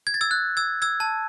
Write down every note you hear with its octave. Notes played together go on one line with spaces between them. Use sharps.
G#6
A6
E6 G#6
F#6
E6 G#6
E6 G#6
A5